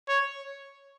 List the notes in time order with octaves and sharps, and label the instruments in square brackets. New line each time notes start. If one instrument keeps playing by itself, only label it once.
[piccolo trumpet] C#5